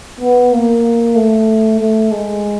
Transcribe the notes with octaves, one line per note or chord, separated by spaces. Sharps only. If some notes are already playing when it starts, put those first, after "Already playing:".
B3
A#3
A3
A3
G#3